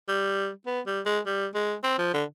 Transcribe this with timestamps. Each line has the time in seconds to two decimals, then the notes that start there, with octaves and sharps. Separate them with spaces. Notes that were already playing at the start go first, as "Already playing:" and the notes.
0.08 G3
0.66 B3
0.87 G3
1.06 G#3
1.26 G3
1.55 G#3
1.84 C4
1.99 F3
2.14 D3